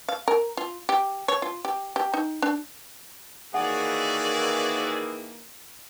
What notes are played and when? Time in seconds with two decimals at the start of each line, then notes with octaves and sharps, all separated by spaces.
0.08 F5
0.28 A#4
0.57 F4
0.89 G4
1.28 C#5
1.42 F4
1.65 G4
1.96 G4
2.14 D#4
2.42 D4
3.54 D#3 E3 A#3 F#4 G#4 C#5 D5 F#5